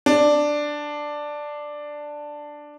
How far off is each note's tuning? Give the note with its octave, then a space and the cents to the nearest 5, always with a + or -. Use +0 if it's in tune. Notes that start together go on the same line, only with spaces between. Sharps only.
D4 +5